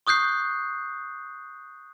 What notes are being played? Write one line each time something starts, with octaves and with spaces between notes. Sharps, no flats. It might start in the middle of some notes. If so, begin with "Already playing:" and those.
C#6 D#6 F#6 G6 C7